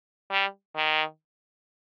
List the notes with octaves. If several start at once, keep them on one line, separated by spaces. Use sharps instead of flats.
G3
D#3